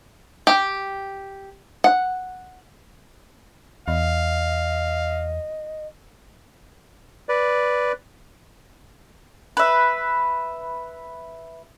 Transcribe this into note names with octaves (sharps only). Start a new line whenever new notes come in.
G4
F#5
E2 D#5 F5
B4 D5
B4 E5